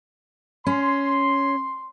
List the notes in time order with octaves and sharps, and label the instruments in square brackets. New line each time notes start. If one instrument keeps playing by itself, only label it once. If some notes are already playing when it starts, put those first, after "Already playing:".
[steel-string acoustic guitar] C#4 [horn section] C6